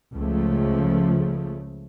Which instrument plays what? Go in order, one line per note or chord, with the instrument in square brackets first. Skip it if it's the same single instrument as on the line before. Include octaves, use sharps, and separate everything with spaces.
[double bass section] C#2 C#3 F3 A3